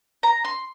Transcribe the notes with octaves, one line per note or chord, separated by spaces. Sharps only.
A#5
C6